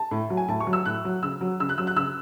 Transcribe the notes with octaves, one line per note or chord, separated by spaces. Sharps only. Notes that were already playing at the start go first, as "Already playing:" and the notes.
Already playing: A5
A2
F#3
G#5
A2 A5
C#6
F#3
E6
A2 F#6
F#3
C#3 E6
F#3
C#3 E6
F#6
F#3 E6
F#6
C#3 E6